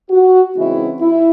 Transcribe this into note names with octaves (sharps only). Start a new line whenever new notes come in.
F#4
C#3 E3 G#3 C4 D#4 E4
E4